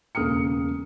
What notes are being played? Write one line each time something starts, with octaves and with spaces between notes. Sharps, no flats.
E1 C#3 A#3 D#6 F6 C#7